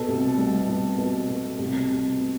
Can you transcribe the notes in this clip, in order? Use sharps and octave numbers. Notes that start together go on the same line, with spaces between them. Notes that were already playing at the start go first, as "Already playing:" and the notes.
Already playing: B2 A4
C2
G3
B2
B2
B2
C2
C2
B2